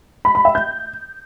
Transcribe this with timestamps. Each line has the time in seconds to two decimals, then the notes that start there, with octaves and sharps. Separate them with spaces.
0.25 B5
0.35 B5
0.45 E5
0.55 G6